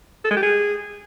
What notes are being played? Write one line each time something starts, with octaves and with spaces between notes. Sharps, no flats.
A4
G#3
G4
G#4